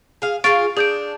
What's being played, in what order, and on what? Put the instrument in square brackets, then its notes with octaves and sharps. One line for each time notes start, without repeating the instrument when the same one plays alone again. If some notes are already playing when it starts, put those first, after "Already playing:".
[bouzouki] G#4 F5
[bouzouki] F4 G#4 F5 [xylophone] C#6 A6 D7
[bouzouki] D4 [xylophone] G#4 G6 D7